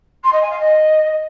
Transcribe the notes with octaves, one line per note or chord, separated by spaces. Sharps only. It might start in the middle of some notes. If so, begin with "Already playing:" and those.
C6
D#5
G#5
F5
D#5